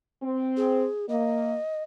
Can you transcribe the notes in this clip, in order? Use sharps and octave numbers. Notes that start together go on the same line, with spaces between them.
C4
G#4
A#3 D#5